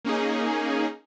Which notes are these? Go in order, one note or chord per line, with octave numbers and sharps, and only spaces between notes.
A#3 C#4 D#4 G#4